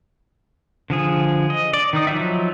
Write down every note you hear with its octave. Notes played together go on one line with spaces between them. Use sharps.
D3 F3 G#4
D#5
D5
D#3 D#4 D#6
F3 F#3 D#4 E5